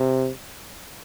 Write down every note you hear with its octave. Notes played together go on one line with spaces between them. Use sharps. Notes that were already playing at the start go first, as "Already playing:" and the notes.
Already playing: C3